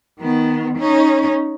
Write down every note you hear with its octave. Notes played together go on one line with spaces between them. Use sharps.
D#3 B3
C#4 D#4